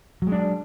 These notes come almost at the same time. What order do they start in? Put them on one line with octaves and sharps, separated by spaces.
F#3 G#3 D4